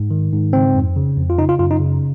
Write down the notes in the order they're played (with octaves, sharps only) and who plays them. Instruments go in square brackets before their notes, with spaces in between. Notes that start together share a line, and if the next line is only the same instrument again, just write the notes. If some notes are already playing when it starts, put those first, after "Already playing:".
Already playing: [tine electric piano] G#2
D#3
G#2
C#3 C4
F2
C#3
F2
F4
C#3 D#4
F4
F#2 F4
D#4
C#3